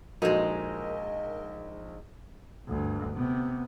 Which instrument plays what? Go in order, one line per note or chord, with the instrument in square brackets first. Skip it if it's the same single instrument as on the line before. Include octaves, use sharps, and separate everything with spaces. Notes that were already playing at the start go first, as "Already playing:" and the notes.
[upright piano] A#1 [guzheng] G#3 D#4 [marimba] F#4 A4 [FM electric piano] A#4 D#5
[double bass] D2 G2
C3 B3